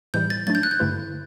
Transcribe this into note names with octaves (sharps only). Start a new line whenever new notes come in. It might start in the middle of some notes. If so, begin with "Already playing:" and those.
A2 E3 G3 G6
A6
F#3 A3 D4 A6
G6
F#6
G6
G2 D3 A3 E4 B4